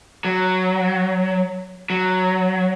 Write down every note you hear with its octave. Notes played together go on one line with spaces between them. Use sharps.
F#3
F#3